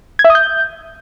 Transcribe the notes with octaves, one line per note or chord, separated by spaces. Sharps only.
G#6
E5
D#6
G6